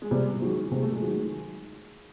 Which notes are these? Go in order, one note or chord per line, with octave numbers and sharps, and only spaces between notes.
G#3
C3 G3
D#3 F#3 G#3
C3 G#3
A3
G#3
D#3 F#3